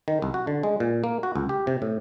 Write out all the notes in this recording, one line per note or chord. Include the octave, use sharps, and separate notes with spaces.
D#3
C2
F#4
D3
G#3
A#2
A#3
F#4
C#2
G4
C3
A2